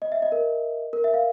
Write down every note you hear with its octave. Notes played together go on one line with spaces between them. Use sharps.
D#5
E5
D#5
A#4
A#4
E5
F5